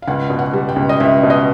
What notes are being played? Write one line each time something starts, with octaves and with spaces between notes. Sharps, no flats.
F5
C#2 F#5
B2
F#5
G3
G5
C#2
D#5
C#2 E5
B2
D#5